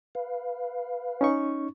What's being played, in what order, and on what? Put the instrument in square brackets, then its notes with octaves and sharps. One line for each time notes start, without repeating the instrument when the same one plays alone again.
[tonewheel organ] B4 F5
[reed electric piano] C#4 D#4 C#6